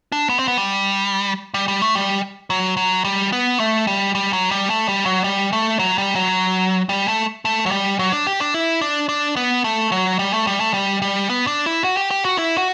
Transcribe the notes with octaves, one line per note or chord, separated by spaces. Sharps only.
D4
B3
C4
B3
G3
G3
G3
A3
G3
F#3
F#3
G3
B3
A3
G3
G3
F#3
G3
A3
G3
F#3
G3
A3
F#3
G3
F#3
G3
A3
A3
F#3
G3
F#3
D4
G4
D4
E4
D4
D4
B3
A3
F#3
G3
A3
G3
A3
G3
G3
B3
D4
E4
F#4
G4
G4
F#4
E4
F#4